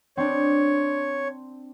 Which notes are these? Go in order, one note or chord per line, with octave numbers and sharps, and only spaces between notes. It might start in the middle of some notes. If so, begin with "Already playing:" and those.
C4 D4 C#5